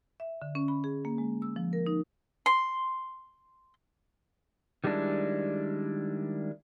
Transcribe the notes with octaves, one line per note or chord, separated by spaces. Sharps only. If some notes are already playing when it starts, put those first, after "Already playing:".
E5
D3
C#4
B5
G#4
A#3
G#3
E6
F3
A#4
D#4
C6
D#3 G3 G#3 A#3 D4 E4